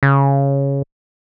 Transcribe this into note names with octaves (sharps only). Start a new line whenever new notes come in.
C#3